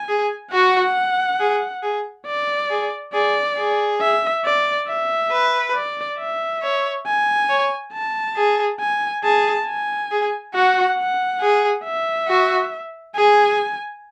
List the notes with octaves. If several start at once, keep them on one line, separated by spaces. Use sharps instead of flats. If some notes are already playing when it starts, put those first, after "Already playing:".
Already playing: G#5
G#4
F#4 F#5
G#4
G#4
D5
G#4
G#4 D5
G#4
E5
D5
E5
B4
D5
E5
C#5
G#5
C#5
A5
G#4
G#5
G#4 A5
G#5
G#4
F#4 F#5
F#5
G#4
E5
F#4
G#4 G#5